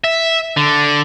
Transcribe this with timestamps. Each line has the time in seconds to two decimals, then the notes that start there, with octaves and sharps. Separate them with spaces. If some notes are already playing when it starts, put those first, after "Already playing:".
0.04 E5
0.57 D3